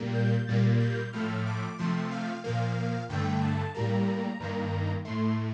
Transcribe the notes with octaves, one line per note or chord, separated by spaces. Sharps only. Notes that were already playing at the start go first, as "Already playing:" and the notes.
Already playing: A#2 G3 A#3
G6
A#2 G3 A#3 A6
G6
A2 F3 A3 F6
D6
C3 F3 A3 C6
F5
A#2 F3 A#3 F5
G2 D3 A3 G5
A5
A2 G3 A#3 A#5
G2 D#3 A#3
A2 A3 C6